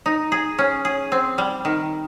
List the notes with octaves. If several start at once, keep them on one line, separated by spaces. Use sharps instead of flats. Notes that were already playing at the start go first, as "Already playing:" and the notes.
D#4
G#4
C#4
G#4
C4
G3
D#3